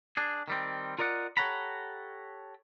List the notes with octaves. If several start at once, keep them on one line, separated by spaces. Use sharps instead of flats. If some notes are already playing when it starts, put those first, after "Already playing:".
D4 G#4
D#3 G3 C4
F4 A#4 D5 D#5 F#5
G4 A4 C#5 F#5 A#5 B5